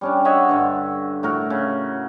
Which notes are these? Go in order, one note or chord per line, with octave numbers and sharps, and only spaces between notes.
G3 C#4 D4
C#5 D#5 E5 F#5
G2 D3
A2 F#4 A#4
C#3